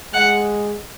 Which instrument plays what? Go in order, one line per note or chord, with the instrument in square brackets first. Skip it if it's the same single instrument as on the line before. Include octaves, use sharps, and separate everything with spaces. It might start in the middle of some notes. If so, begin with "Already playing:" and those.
[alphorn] G#3 [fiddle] F#5